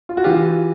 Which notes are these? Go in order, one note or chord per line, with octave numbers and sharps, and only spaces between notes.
F4
F#4
E3 F4 G4